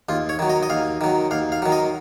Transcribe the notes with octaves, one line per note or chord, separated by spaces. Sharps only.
D#2 F4
C#5
D#3 F#3
D#5
D#5
D#2 F5
D#3 F#3
D#2 F5
F5
D#3 F#3
D#5